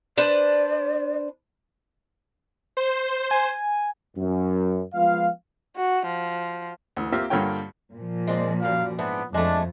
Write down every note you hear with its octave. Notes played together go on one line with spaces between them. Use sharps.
D4 B4 C5 D5
C5
G#5
F#2
F3 G#3 B3 F4 F5
F#4
F3
D2 E3
A#3 C4 F4 G4 E5
G2 D3 A#3 F4 C#5 G5
A#2 F3
G#3 C4 D5
F#2 G3 F5
G#2 E3 B3 D4
F2 G#3 A3 D4